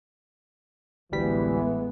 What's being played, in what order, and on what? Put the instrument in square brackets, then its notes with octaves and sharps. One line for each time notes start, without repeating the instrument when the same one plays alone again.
[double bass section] A1 G#3 B3 [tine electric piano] D2 G3 B6 [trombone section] E3